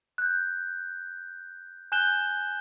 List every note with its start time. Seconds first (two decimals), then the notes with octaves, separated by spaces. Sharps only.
0.18 F#6 G6
1.92 G#5 F#6 G6 E7 G7